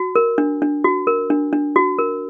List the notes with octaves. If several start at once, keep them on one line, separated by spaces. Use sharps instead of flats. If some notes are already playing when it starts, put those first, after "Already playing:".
Already playing: F#4
A#4
D4
D4
F#4
A#4
D4
D4
F#4
A#4